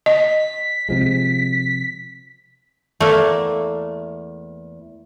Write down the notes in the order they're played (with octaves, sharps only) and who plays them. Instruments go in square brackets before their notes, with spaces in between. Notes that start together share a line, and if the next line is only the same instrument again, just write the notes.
[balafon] D#5 [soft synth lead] B6
[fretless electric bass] C3 F3 G#3
[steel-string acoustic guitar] E2 [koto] A3 A#3